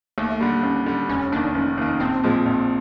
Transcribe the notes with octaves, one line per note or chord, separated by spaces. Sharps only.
D#2 A3
D3 G3 A#3
D#2 C#4
D3 G3
F1 C#4
D#2 D#3 D4
F1 C#4
D#2 D#3
A#1 C4
A#2 F3 G#3
A#1